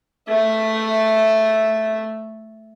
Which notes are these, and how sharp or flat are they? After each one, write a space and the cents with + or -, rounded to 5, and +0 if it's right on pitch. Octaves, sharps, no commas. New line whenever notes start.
A3 +0 E5 +0